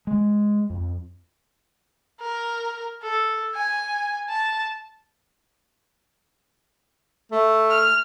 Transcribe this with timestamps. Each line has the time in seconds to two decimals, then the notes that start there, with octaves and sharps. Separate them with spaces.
0.07 G#3
0.70 F2
2.21 A#4
3.03 A4
3.55 G#5
4.29 A5
7.32 A3
7.70 F6